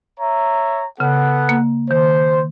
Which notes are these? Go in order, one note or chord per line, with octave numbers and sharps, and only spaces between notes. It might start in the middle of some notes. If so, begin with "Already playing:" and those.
C#5 E5 A#5
C#3 B3 A4 F#5
A#3
D#3 C5